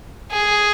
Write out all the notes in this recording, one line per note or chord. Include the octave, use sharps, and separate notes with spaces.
G#4